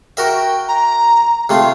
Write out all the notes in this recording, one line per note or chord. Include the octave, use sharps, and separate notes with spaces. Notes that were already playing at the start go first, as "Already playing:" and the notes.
F#4 A#4 E5 G5
A#5
C3 A3 F4 F5